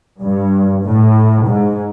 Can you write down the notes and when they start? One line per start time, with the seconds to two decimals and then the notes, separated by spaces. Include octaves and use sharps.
0.22 G2
0.85 A2
1.48 G#2